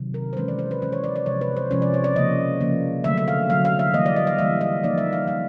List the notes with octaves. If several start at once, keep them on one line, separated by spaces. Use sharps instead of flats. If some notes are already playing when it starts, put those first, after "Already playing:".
Already playing: C3 D#3 F#3
A#4
C5
E3 G#3 C#4 B4
D5
C5
B4
E3 G#3 C#4 C5
C#5
D5
D5
C3 F3 G#3 C#4 C#5
B4
C5
C3 F3 G#3 C#4 C#5
D5
C#5
D5
C#3 F3 A#3 D#5
C#3 F3 A#3
D3 F#3 A3 E5
E5
F5
D3 F#3 A3 F5
F5
E5
E3 G3 A#3 D#5
D5
D#5
F5
E3 G3 A#3 E5
D#5
F3 A#3 D#4 D5
E5
F5
F3 A#3 D#4 F5